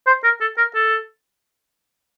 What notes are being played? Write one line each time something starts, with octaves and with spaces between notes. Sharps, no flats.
C5
A#4
A4
A#4
A4